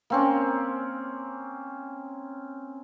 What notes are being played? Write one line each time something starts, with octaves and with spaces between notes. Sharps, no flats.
A#3 C4 C#4